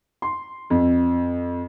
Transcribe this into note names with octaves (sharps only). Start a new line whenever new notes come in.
C6
F2